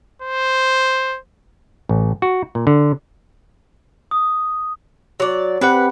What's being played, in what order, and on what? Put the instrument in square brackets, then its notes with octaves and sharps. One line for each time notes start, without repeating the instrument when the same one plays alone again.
[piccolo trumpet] C5
[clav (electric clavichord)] A1
F#4
A#2
D3
[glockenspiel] D#6
[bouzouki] F#3 D5
[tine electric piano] C4 G4 F#5 [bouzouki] B4